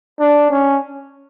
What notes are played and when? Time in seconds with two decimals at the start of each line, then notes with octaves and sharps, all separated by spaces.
0.20 D4
0.51 C#4